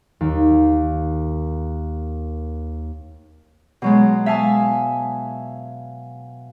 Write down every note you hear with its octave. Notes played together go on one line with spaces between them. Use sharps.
D#2 A#3
B2 F#3 G#3
E5 F5 G#5 A5 D#6